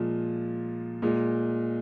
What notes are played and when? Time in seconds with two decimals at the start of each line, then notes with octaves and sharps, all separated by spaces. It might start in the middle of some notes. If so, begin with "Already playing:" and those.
Already playing: A#2 F3 G#3
1.02 A#2 G#3